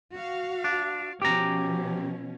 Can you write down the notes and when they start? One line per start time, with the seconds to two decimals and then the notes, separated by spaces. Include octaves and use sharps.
0.14 F#4 F5
0.64 D4
1.22 B2 F3 C#4 G4 A#5